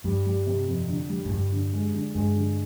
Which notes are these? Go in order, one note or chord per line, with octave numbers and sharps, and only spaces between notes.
G2 G3
G3
C3
F2
D3
G3
G#2
G2 G3
D3
G#3
D3
G2 G#3
D3